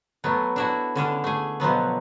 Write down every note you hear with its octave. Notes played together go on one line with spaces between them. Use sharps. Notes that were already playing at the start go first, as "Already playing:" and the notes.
F#3 A3 B3
D4 E4 F#4
D3 C#4 D4
A3 G#4
B2 F3 F#3 B3